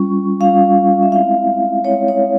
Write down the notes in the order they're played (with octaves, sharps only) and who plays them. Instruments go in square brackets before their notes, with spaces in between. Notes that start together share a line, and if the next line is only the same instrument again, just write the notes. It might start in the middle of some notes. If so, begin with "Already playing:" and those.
Already playing: [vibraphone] G3 C#4 F4 C#6
G3 C#4 F4 F5
E5
G#3 C4 E4 F5
G#3 C4 E4 C#5
C#5